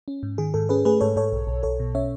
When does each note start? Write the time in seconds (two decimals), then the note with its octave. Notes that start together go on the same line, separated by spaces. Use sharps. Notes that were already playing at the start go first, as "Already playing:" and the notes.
0.08 C#4
0.23 G#2
0.38 D#3 G#4
0.54 G#2 A4
0.69 C#4 G#4 B4
0.85 A3 G#4 B4
1.00 G#2 A4 C#5
1.16 G#2 A4 C#5
1.32 B1
1.47 B1
1.63 B1 A4 C#5
1.80 B2
1.95 C#4 C#5 E5